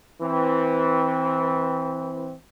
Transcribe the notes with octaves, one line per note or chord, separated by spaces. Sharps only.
E3 C4